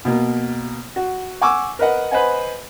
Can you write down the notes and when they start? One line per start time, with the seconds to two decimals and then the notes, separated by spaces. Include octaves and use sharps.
0.05 B2 A#3
0.96 F#4
1.41 F#5 G#5 C#6 D6 E6
1.79 A#4 B4 D#5 F#5
2.11 B4 C5 D#5 F#5 G#5